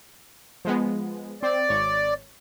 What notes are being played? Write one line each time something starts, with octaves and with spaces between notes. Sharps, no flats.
F3 G#3 B3
C4 D5
G#1 C#5